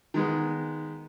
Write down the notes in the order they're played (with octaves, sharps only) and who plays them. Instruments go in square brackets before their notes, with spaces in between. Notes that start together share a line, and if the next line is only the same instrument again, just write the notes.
[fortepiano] D#3 G#3 B3